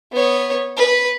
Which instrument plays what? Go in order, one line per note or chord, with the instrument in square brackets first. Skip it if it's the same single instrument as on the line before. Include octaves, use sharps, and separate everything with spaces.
[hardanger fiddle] B3 C#5
B4